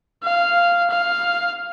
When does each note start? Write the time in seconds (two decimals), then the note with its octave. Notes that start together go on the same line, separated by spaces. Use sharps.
0.24 F5
0.90 F5